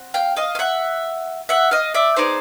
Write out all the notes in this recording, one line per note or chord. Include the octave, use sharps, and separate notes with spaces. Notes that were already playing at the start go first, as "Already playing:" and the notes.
Already playing: C4 F#4
F5 G5
D#5 F5
F5
E5 F#5
E5 F#5
D#5 F5
D5 E5
B3 D#4 G#4 C5 D5